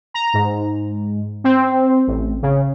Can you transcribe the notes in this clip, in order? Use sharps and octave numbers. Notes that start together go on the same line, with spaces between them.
A#5
G#2
C4
A1
C#3